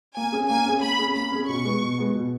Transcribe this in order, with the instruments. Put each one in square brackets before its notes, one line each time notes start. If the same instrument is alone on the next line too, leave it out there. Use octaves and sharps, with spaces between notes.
[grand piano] A#3 [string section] G#5
[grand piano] C#4 G#4
[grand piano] A#3 [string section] G#5
[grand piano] C#4 G#4
[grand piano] A#3 [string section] B5
[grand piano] C#4 G#4
[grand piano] A#3 [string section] B5
[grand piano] C#4 G#4
[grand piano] B2 [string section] C#6
[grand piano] G#3 B3
B2
G#3 B3
B2